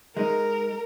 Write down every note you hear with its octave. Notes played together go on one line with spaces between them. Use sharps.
G#3 D#4 A#4